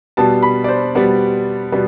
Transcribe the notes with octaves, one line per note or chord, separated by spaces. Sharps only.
B2 G3 B3 A5
B5
D5
C5
B2 G3 B3 D5
B2 G3 B3